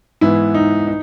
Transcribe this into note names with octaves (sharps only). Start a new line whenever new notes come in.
G#2 E3 B3 E4
D#4
D#4